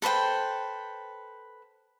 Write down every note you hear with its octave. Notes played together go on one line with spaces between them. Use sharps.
A4 B4 C5 G5